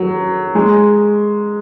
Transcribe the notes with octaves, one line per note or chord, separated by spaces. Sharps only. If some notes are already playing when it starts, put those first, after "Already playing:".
Already playing: F#3
G#3